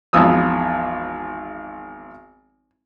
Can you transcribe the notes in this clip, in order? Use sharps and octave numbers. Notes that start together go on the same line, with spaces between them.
G#1 E2 F3 D#6 E6